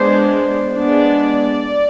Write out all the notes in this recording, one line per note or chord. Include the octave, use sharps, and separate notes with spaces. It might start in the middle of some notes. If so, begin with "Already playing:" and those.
Already playing: G#3 B3 D4 C5
G#3 B3 D4 D5